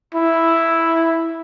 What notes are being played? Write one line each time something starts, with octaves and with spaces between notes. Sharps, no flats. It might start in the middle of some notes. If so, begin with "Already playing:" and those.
E4